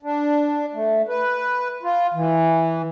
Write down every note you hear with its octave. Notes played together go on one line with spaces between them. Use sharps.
D4
A3
B4
F4
E3